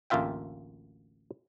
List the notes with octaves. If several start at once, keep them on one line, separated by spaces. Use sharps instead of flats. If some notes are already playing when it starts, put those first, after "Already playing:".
A1 D2 A#3 F4 E5 G5